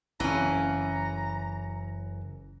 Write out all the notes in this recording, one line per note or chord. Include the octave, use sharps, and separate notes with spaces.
F#1 E3 C#4 A#5